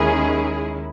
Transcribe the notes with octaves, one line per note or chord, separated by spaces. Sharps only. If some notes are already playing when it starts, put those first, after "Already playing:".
Already playing: D#2 D#3 G#3 C#4 E4 G#4